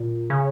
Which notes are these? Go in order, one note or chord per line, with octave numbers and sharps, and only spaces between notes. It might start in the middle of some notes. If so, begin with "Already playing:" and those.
Already playing: A#2
C#3